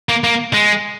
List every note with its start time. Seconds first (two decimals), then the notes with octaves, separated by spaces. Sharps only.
0.09 A#3
0.24 A#3
0.54 G#3